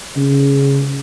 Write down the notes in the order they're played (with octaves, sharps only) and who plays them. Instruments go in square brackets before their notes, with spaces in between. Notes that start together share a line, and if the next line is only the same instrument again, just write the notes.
[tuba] C#3